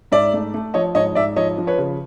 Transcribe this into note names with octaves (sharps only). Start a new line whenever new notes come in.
G#2 D5 E5
A3
A3
F3 C#5 D#5
G#2 C#5 D#5
G#2 D5 E5
F3 C#5 D#5
F3
B4 C#5
C#3